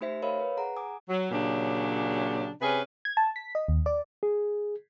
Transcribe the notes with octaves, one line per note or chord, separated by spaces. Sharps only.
A3 D#4 G4 C5 E5 B6
A#4 C#5 D#5 F5 B5
B4
G#4 F#5 A#5
G#5 D6 D#6
F#3
A#2 C#3 F#3 D4 G4
C3 C#4 G#4 B4
G#6
A5
B6
D#5
D#2
D5
G#4